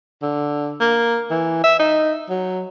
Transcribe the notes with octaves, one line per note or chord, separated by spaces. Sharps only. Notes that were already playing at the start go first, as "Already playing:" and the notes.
D3
A#3
E3
E5
D#4
F#3